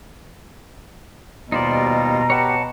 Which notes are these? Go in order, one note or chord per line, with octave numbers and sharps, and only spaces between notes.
D#2 B2 G3 D#4 F4 C5 D5 A#5
G4 B4 C#5 F#5 A5